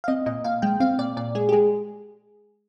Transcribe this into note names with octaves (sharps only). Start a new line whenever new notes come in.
F5
C4 D#5
A#2 D#5
A#2 F5
G#3 G5
C4 F5
A#2 D5
A#2 D5
G#3 G#4
G4
G#3 G#4